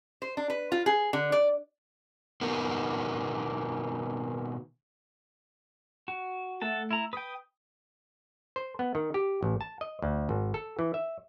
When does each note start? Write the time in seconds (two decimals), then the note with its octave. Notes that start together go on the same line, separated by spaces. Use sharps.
0.22 C5
0.37 D4
0.50 B4
0.72 F4
0.86 G#4
1.13 D3
1.32 D5
2.41 B2 D#3 A#3 B3
6.08 F#4
6.62 A3 A4 F#5 A5
6.91 E4 A#5
7.13 B4 G5 D#6
8.56 C5
8.79 B3
8.95 D#3
9.14 G4
9.43 A1
9.61 A5
9.81 D#5
10.02 D2
10.29 G#1
10.54 A4
10.79 E3
10.94 E5